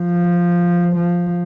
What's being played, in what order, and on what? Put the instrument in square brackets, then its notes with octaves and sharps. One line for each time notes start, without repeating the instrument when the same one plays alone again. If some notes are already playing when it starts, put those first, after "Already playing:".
Already playing: [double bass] F3
F3